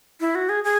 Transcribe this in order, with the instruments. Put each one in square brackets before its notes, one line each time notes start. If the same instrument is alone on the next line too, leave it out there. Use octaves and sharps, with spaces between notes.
[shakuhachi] E4
F#4
G#4
G#4